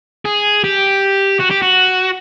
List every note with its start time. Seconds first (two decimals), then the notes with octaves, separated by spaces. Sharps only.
0.25 G#4
0.64 G4
1.39 F#4
1.50 G4
1.62 F#4